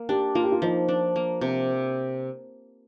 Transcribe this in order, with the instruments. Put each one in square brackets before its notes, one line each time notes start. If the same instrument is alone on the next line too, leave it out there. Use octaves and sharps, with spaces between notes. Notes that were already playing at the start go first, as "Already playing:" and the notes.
Already playing: [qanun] A#3
[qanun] D4 [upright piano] G4
[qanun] A#3 [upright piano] F4
[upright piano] G4
F4
[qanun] F3 [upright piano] D#4
[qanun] D4
A#3
C3